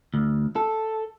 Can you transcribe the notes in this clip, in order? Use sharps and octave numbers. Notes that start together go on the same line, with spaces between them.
D2
A4